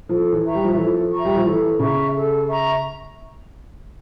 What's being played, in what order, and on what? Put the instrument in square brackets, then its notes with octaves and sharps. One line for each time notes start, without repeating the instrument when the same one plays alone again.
[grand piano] F3 [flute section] A4
[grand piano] E3
[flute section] E5 A#5 C#6
[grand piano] G3
F3
[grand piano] E3 [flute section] A4
[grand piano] F3
[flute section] E5 A#5 C#6
[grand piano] G3
F3
[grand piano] E3 [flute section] A4
[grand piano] C#3 [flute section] E5 A#5 C#6
[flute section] A4
E5 A#5 C#6